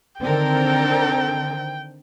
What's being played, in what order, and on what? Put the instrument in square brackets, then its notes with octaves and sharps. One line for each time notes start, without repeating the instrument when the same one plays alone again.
[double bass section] D3 D#3 C4 [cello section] D4 A4 A#4 [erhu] G5